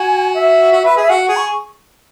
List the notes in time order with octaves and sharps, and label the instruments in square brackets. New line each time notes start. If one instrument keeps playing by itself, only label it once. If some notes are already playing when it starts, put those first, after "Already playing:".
Already playing: [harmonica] F#4 [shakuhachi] G#5
[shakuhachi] E5
[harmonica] F#4
B4
G#4
[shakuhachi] E5
[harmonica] F#4 [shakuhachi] F#5
[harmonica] G#4
[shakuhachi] C#6